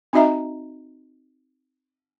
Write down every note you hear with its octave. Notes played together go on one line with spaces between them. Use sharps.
C4 D#4 F#4 D#5 E5 A#5